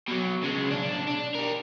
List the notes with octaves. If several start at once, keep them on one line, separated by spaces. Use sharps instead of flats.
B2 F#3
C#3 G#3
B1 D4
D4
G4 A#4